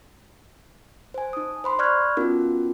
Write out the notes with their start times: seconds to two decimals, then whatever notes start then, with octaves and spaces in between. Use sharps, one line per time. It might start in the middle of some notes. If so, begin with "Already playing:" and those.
1.14 C5 G#5
1.33 D#4 D#6
1.64 C5 B5 C6
1.79 D5 B5 C#6 F6 F#6 G#6
2.17 B3 C#4 D#4 F4 F#4 A#4